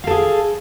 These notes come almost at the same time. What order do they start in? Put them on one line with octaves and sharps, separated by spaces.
F5 A4 G#4